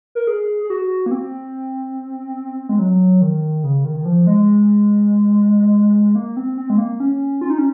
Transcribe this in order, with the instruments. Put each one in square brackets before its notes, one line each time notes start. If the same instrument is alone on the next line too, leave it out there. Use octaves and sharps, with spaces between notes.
[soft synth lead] A#4
G#4
G#4
F#4
A#3
C4
G#3
F#3
D#3
C#3
D#3
D#3
F3
G#3
A#3
C4
C4
G#3
A#3
C#4
F4
D#4
C#4